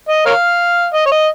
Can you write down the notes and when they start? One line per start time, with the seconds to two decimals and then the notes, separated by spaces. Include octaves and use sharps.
0.09 D#5
0.26 A#4 C#5 F5
0.94 D#5
1.06 C#5
1.12 D#5